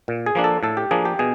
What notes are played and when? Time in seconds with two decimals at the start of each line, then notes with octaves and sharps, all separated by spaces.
0.08 A#2
0.26 G#4
0.35 F3 A#3 D4
0.44 A4
0.63 A2 A4
0.77 G4
0.91 F3 A#3 D4 G#4
1.05 G4
1.19 B2 G#4